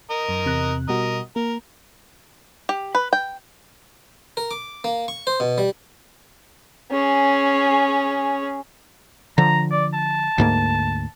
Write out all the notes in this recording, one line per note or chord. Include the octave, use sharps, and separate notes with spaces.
A#4 D#5
F#2
E2 C3 F#6
B2 G3 F#4 A#4 D#5
A#3 A#4
G4
B4
G5
A#4
D6
A#3
C#6
C5
B2
G3
C#4 G#4
D3 F3 A#5
D5
A5
D2 G#2 A#3